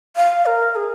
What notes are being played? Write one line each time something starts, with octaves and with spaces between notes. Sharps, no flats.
F5
A#4
G#4